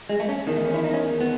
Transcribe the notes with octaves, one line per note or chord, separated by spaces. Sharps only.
G#3
A3
C#4
E2 D#3
A3
C#4
E4
D#4
C#4
B3